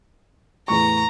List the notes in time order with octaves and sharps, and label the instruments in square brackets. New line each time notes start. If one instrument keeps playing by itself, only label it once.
[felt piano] E2 A2 C#6 [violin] A#5